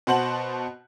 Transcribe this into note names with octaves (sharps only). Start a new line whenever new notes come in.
B2 F#4 C5 F#5 A5 F#7